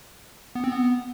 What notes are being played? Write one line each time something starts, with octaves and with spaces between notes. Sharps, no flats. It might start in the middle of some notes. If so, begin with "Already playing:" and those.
B3
C4
B3